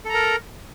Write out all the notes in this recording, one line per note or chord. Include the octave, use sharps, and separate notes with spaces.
A4 A#4 A#5